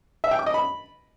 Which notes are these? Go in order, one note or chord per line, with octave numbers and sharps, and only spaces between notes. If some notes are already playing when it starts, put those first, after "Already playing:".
E5
G5
D6
D#5
B5